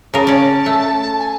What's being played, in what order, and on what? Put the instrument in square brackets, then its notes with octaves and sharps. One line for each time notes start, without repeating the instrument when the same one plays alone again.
[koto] C#3 A#4 [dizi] A5
[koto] C#4 D5
A3
[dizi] G#5